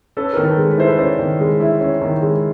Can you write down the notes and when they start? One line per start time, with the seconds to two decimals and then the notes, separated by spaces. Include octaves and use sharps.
0.17 C#4 A4 B4
0.33 D#3 A#4
0.43 A4 B4
0.57 G#3
0.71 B4
0.78 E4 C5
0.87 A4 B4
0.98 C#4 C5 D5
1.19 D#3
1.40 G#3
1.60 E4
1.81 C#4
2.01 D#3
2.22 G#3